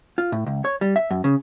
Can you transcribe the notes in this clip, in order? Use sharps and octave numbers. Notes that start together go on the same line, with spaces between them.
F4
A2
C#2
C#5
G3
E5
F#2
C#3